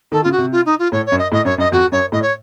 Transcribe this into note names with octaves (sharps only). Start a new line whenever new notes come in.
D#3 A4
C#3 F4
F#4
C3
F4
D#4
F4
A2 C#5
C#5
F#2
D#5
A2 D#5
F#2 C#5
F#2 D#5
F2 F#4
F#2 C#5
A2 D#5
C#5